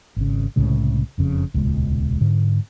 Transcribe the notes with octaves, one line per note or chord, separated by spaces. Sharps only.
G#1 C#3
C2 A2 C#3 G#3
F#1 F2 C#3
D#1 C#2 B2 G#3
G#2 D3